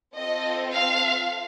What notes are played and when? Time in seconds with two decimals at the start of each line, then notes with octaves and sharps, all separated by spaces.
0.17 C4 F4 A4 D#5
0.73 F5